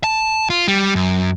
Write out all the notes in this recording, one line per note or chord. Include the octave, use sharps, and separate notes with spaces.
A5
F4
G3
F#2